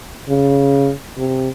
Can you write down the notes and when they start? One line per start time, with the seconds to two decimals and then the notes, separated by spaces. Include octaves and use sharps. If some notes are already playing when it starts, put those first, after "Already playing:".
0.29 C#3
1.18 C3